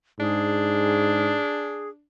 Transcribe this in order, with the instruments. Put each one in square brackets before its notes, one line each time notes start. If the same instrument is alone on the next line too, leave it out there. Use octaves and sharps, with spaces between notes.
[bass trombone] G#2 [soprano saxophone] D4 [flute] G#4